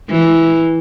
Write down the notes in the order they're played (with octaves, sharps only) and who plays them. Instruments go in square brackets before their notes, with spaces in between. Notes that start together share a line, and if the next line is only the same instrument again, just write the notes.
[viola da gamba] E3